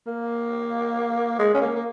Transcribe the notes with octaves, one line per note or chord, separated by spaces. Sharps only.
A#3
G#3
C#4
A#3
A#3